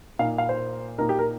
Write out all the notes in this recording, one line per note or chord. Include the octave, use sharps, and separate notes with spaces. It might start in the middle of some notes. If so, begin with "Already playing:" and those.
A#2 A#3 D#4 F5
F5
C5
A#2 A#3 D#4 A#4
G4
A#4